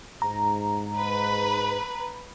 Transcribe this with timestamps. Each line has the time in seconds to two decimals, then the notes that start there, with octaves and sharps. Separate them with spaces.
0.22 G#2 A#5
0.99 B4